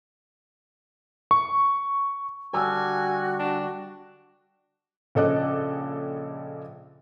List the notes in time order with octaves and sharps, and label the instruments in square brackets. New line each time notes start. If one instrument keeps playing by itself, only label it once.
[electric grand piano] C#6
[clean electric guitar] D3 G3 A4 [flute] F#4 [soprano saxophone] G#5
[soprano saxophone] D4
[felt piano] A#1 C#3 A4 D#5 D6 F#6